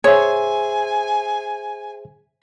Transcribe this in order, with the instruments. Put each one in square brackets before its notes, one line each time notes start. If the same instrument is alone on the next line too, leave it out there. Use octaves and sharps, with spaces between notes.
[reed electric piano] G#4 C5 E5 [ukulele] C#5 [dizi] G#5